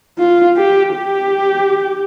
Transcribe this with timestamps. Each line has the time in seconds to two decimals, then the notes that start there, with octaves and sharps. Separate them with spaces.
0.18 F4
0.57 G4
0.94 G4